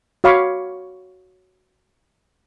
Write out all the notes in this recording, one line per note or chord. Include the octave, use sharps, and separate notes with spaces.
F#4 C#5 F5 B5 C#6 D6